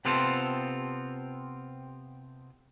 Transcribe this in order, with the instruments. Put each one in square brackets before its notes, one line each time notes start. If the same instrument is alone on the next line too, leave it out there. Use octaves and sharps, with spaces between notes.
[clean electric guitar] C3 B3 C4 F4 A4 C5